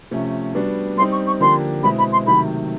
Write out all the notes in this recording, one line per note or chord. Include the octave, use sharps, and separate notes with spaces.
C3 F3 A3 C#4
G3 B3 D4 F#4
G3 C4 D#4 C6
C#6
C#6
D3 F3 A#3 D4 G4 C6
B2 G#3 C4 E4 B5
B5
C6
C3 D#3 F#3 A3 B5